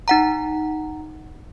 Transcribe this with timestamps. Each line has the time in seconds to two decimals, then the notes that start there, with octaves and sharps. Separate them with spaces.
0.08 D#4 F#5 A#5